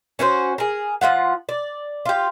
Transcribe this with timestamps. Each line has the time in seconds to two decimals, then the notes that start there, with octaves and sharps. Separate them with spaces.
0.19 C#4 F#4 A#4 C5
0.58 G#4 A#4
1.01 F3 C#4 F4 F#5
1.49 D5
2.05 F4 G4